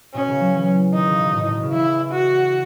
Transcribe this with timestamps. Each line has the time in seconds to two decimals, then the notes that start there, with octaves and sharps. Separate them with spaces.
0.14 B2 C#4
0.28 C#3
0.40 F#3
0.54 E3
0.93 D#3 D#4
1.06 C#3
1.19 B2
1.33 A2
1.43 A2
1.53 B2
1.63 C#3
1.73 E3 E4
2.12 F#4